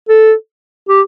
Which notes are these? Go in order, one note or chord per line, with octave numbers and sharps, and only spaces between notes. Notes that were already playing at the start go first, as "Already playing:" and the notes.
A4
G4